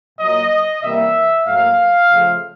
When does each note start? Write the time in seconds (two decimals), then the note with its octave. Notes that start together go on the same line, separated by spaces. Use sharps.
0.19 A#2 F#3 A#3 D#5
0.82 C3 E3 G3 A#3 E5
1.46 A2 F#3 A#3 F5
2.11 C#3 F3 A3